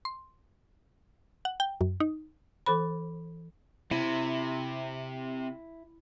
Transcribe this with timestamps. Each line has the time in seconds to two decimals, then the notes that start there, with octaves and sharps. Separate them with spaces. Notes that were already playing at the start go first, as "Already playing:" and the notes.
0.05 C6
1.45 F#5
1.60 G5
1.81 F#2
2.00 D#4
2.66 E3 A4 C5 B5
3.91 C3 E4